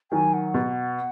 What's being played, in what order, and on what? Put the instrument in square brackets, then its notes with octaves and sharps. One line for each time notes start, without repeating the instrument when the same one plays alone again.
[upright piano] D#3 F#3 [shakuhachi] G#5
[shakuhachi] F#5
[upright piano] B2